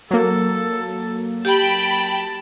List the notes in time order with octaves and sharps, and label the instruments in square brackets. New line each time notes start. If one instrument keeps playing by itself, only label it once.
[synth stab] F#3 A#3 [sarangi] A4
[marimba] G4 [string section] G5 B5 [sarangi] A5